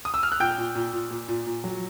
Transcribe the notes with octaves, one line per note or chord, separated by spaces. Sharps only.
D#6
E6
F6
F#6
A#2 G5 G6
A#2
A#2
A#2
A#2
A#2
A#2
F#3